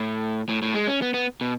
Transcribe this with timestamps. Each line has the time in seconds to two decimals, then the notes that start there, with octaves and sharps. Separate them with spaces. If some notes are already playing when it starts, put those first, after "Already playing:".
Already playing: A2
0.49 A2
0.62 A2
0.75 G#3
0.88 C#4
1.02 B3
1.14 B3
1.41 B2